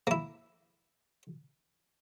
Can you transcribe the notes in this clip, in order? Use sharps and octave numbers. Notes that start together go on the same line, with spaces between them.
A#3 E4